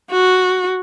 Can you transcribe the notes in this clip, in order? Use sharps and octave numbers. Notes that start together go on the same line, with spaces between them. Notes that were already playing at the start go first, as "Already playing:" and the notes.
F#4